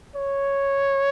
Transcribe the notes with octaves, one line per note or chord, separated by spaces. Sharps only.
C#5